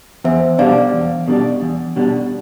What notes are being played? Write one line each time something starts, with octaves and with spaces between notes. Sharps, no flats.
E2 C5 E5
B2 G3 D4 D5 F5
E2
B2 G3 D4
E2
B2 G3 D4